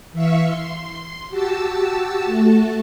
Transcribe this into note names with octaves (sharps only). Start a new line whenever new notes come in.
E3 E5 F5 C#6 E6
C6
F#4 G4 A5 E6
A3 F#4 A5